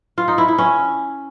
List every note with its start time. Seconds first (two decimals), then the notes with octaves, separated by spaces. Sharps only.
0.18 F4
0.28 D#4
0.38 E4
0.48 E4
0.58 C#4